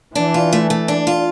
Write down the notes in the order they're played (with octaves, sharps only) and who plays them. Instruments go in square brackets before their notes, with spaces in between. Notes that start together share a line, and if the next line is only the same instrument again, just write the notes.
[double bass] E3 [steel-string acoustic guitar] D4
[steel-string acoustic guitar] F4
A3
A3
D4
F4